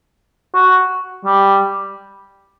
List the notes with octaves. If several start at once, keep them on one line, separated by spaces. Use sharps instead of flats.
F#4
G3